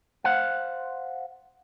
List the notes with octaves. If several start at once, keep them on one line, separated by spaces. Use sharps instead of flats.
C5 F5 F#5